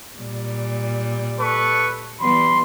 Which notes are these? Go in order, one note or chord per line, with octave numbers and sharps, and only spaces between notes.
A#2 G3
A4 B4 C#6
E3 G3 B3 B5 C6